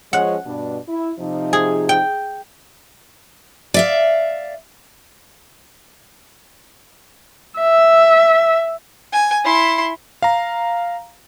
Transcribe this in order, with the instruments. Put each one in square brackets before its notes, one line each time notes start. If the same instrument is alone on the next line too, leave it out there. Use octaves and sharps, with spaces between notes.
[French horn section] F3 G#3 C#4 [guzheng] F#5
[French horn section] G2 B2 D4
E4
C3 F3 D#4
[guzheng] G#4
G5
[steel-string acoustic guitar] D5 E5 F5
[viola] E5
[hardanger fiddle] G#5
E4 C6
[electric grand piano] F5 A#5